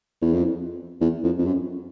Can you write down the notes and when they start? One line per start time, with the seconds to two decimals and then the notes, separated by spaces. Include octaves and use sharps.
0.22 E2
0.33 F2
1.01 E2
1.24 F2
1.39 F2
1.46 F#2